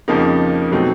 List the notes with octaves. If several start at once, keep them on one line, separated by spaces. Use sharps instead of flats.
F2 C#3 F3 A#3 D#4
B2 F#3 A3 C4 D#4